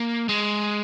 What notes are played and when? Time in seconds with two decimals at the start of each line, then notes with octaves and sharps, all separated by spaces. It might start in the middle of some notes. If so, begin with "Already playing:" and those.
Already playing: A#3
0.29 G#3